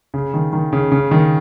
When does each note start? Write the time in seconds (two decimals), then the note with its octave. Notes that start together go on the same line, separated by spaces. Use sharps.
0.14 C#3
0.34 D#3
0.53 D#3
0.73 C#3
0.92 C#3
1.11 D#3